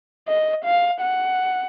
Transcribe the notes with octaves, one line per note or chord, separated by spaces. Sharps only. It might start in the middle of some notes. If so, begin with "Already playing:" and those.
D#5
F5
F#5